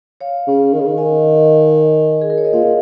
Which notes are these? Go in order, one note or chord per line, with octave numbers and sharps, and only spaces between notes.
C#5 F5
C#3
D#3
C#3
D#3
D#5 G#5
G#4
A#4
C#5
D#5
A#2 C#5 F5
A#2